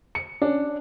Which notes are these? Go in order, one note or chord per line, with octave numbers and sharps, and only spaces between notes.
C#7
C#4 D4